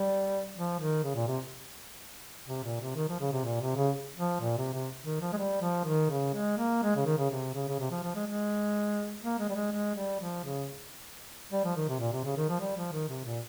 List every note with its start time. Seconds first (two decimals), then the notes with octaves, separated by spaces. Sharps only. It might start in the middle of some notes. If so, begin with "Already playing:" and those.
Already playing: G3
0.56 F3
0.80 D#3
1.03 C#3
1.15 A#2
1.28 C3
2.48 C3
2.64 A#2
2.80 C3
2.95 D#3
3.09 F3
3.20 C#3
3.32 C3
3.45 A#2
3.61 C3
3.76 C#3
4.16 F3
4.41 A#2
4.57 C3
4.73 C3
5.05 D#3
5.21 F3
5.32 G#3
5.37 G3
5.61 F3
5.85 D#3
6.10 C#3
6.34 G#3
6.57 A#3
6.82 G#3
6.96 C#3
7.06 D#3
7.18 C#3
7.30 C3
7.54 C#3
7.69 C#3
7.79 C3
7.91 F3
8.03 F3
8.15 G#3
8.26 G#3
9.23 A#3
9.39 G#3
9.49 G3
9.55 G#3
9.71 G#3
9.95 G3
10.20 F3
10.44 C#3
11.52 G3
11.64 F3
11.76 D#3
11.88 C3
12.00 A#2
12.12 C3
12.24 C#3
12.37 D#3
12.49 F3
12.61 G3
12.76 F3
12.92 D#3
13.09 C3
13.25 A#2